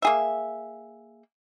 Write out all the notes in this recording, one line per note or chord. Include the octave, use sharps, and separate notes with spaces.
A#3 G#4 E5